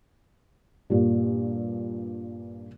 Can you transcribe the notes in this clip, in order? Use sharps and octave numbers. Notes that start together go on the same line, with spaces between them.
G2 A#2